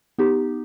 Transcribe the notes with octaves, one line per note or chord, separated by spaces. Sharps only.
B3 D#4 G4